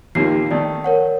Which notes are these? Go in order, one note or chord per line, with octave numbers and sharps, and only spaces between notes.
D#2 A#3 D#4 F4 G4 C7
D#3 A3 D5
A#4 C#5 F#5